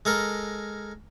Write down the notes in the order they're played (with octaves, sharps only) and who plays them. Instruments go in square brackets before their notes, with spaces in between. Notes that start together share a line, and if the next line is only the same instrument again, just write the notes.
[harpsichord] G#3 A4 A#4